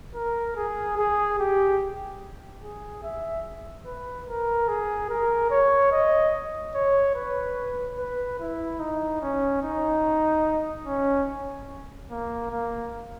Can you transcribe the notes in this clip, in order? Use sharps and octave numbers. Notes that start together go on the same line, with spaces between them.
A#4
G#4
G#4
G4
G#4
E5
B4
A#4
G#4
A#4
C#5
D#5
C#5
B4
B4
E4
D#4
C#4
D#4
C#4
A#3
A#3